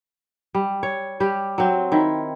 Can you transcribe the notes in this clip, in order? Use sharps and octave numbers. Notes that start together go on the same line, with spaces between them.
G3
C#5
G3 G4
F#3 C4
D#3 E4